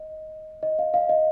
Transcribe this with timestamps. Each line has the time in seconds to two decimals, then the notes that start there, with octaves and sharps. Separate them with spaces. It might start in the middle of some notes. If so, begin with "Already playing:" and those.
Already playing: D#5
0.63 D#5
0.79 F5
0.94 F5
1.09 D#5